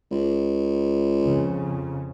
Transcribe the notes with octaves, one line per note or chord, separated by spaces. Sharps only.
C#2
F2 C#3